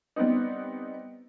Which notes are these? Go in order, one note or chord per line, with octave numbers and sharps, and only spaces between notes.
G3 B3 C4 D#4